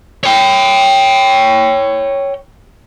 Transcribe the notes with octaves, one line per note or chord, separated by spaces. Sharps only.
C#5 G5